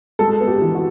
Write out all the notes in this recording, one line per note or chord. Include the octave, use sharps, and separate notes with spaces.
G#3 A4
B3
G4
E3
F#4